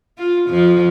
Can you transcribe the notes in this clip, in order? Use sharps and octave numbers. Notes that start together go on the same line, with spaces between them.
F4
F2 F3